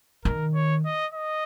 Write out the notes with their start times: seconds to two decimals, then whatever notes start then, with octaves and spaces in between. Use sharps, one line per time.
0.25 D#3 A#4
0.55 C#5
0.85 D#5
1.14 D#5